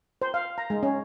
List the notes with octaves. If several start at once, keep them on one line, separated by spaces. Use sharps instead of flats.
C5
F5
A#5
G#3
C#4